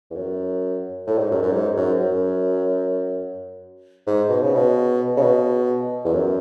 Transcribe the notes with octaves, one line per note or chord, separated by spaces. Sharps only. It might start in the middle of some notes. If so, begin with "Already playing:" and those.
E2
F#2
A2
G#2
F#2
F#2
G#2
F#2
F#2
G#2
B2
C#3
B2
C#3
B2
E2
F#2